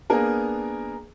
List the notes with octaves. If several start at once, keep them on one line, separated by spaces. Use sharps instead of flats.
A#3 B3 D4 G#4 A#4